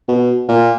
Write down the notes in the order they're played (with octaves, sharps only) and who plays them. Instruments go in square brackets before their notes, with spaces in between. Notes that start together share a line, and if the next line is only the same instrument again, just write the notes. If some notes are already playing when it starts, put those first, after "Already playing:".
[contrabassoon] B2
A#2